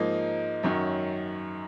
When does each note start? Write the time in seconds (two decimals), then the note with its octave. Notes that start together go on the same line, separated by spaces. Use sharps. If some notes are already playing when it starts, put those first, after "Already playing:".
Already playing: G#2 F3 A#3 D#4
0.63 F#2 D#3 F#3 C#4